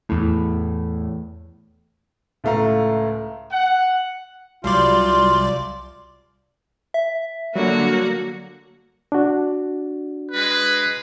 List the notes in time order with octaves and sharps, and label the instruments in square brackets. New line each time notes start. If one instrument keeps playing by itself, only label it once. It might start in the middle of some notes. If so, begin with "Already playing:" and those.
[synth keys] E2 A2
[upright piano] C#2 A2 A3 F5 A#5
[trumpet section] F#5
[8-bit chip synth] C2 D5 [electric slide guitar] F#3 G3 [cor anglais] F4 [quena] C6
[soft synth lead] E5
[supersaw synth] D3 F#3 [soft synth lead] G3 [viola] A#3 F#4
[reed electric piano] D4 F#4
[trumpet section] G#3 B4